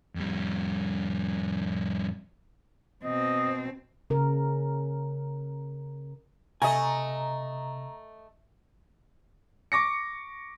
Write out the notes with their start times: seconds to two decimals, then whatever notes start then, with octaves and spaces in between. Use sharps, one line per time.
0.16 F2 G3
3.05 B2 C4 D#5
4.10 C#3 A#4
6.62 C3 A3 D#5 G#5 A#5
9.72 C#6 D6 A#6 C#7